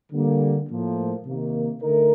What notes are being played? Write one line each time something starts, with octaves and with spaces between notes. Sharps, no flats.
D3 G3 A#3
A2 F3 A#3
C3 D#3 A#3
D3 A3 D#4 A#4